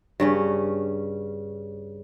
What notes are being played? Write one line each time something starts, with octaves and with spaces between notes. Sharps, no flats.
G2 C#3 C#4